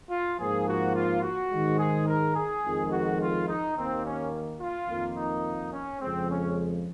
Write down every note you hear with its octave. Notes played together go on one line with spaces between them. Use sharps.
F4
G#2 F3 A#3 G#4
F#4
F4
F#4
G#2 D#3 G#3
G#4
A#4
G#4
F2 D#3 G#3
F#4
F4
D#4
D#2 D#3 A#3 C4
C#4
F4
F2 D#3 A#3
D#4
C#4
F2 C#3 G#3 C4
C#4